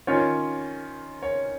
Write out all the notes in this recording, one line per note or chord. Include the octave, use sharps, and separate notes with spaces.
D#3 C#4 F4 C#5
C#5